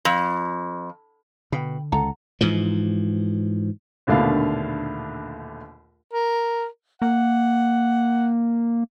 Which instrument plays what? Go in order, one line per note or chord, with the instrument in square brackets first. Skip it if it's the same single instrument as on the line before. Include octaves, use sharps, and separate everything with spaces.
[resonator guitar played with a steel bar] F2
[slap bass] B2 [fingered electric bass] D3 [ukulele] G5 B5
[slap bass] C#2 [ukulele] A4 F#5 A#5
[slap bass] G#2 E3 F3
[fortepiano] A#1 D#2 B2 D3 A3 F5
[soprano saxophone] A#4
[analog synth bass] A#3 [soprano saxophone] F#5